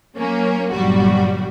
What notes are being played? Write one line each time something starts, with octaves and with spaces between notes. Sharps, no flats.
F#3 A#3 C#4
G1 A#2 F#3 G3 F#4